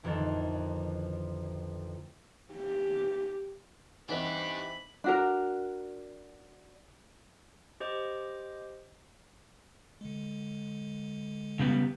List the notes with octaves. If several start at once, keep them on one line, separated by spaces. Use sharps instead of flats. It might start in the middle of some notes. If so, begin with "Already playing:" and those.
A1 F2 D3 D#3 A4
G4
E3 C4 D4 D#4 G4 D#5 F#5 B5
D4 F#4 A#4
G4 C5 D#5 D6
D3 G#3
C#3 G3 B3